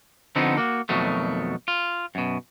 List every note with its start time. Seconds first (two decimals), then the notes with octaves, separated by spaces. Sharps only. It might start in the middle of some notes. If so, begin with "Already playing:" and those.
0.36 D3 F3 B3 C4 D#4
0.58 A#3 F#4
0.89 F2 B2 D#3 F#3 A3
1.68 F4
2.15 F#2 B2